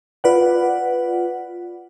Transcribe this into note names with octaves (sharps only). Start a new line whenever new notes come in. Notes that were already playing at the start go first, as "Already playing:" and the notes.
F4 B4 D5 F#5